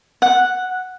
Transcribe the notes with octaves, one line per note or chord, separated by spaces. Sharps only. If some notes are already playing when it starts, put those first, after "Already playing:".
F#5